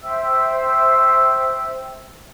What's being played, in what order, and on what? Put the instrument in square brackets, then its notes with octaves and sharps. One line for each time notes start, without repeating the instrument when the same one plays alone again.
[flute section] C5 E5 G5 E6